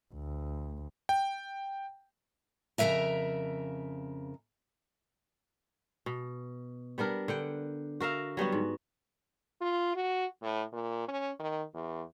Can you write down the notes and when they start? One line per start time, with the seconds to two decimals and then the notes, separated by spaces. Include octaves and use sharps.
0.14 D2
1.09 G5
2.78 F2 C#3 F#3 A#4 E5 A#5
6.06 B2
6.98 G3 B3 D4 A#4
7.28 D3 F#5 G5
8.00 F#4 A#4 E5 F5
8.37 F#3 G3 B3 F#4
8.52 G#2
9.61 F4
9.96 F#4
10.42 A2
10.73 A#2
11.08 C#4
11.39 D#3
11.74 E2